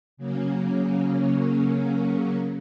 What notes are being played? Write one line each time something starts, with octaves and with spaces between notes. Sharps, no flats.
C#3 F#3 A#3 C#4